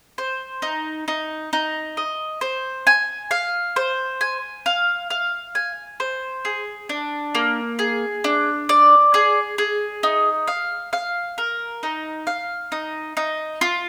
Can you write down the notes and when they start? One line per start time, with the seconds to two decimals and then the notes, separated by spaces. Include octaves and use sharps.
0.18 C5
0.62 D#4
1.08 D#4
1.53 D#4
1.97 D#5
2.41 C5
2.87 G#5
3.31 F5
3.76 C5
4.21 G#5
4.66 F5
5.10 F5
5.55 G#5
6.00 C5
6.45 G#4
6.89 D4
7.35 A#3
7.79 G#4
8.24 D4
8.69 D5
9.14 G#4
9.58 G#4
10.03 D#4
10.48 F5
10.93 F5
11.38 A#4
11.83 D#4
12.27 F5
12.72 D#4
13.17 D#4
13.61 F4